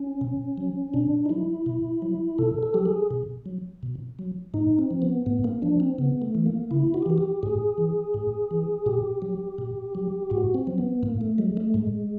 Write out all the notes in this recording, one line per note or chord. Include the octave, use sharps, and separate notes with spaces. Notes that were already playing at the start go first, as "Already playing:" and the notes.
Already playing: C#4
B2
F#3
B2 D4
D#4
F#3 E4
B2
F#3
B2 A4
A4
F#3 G4
G#4
B2
F#3
B2
F#3
A2 D#4
C4
F3
B3
A2 B3
A#3
F3 D4
C4
C#3 B3
A3
E3
A#3
C#3 E4
F#4
G4
E3 F#4
G4
A2 G#4
E3
A2
E3
A#2 G4
F#3
A#2
F#3
A2 F#4
C4
F#3
B3
A2 A#3
A3
F#3 G#3
A3
A2 G#3